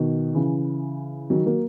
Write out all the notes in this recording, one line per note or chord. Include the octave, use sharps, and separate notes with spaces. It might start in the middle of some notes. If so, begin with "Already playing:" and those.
Already playing: B2 D#3
C#3 E3
D#3 F#3
F#3 A#3